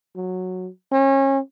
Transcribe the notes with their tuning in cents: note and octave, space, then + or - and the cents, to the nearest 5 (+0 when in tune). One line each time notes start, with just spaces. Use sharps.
F#3 -10
C#4 -30